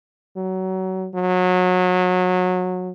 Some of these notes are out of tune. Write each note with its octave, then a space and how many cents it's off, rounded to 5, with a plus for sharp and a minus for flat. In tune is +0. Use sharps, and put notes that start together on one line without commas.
F#3 +25
F#3 -25